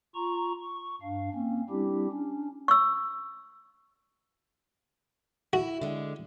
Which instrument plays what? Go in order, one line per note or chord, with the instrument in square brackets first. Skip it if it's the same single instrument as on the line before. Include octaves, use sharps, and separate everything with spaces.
[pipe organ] F4 A#5 C#6
C#6
G2 D4 F5
A#3 C4 C#4
G3 C4 D4 E4 G4
C#4 D4
[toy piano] C#6 E6
[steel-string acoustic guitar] E4 [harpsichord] F#4
[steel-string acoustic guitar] D3 G#3